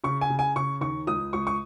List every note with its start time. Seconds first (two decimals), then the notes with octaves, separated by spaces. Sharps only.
0.04 C#3 C#6
0.21 G#5
0.30 C#3
0.39 G#5
0.56 C#3 C#6
0.81 D#2 C#6
1.07 C#2 D#6
1.33 C#2 C#6
1.47 C#6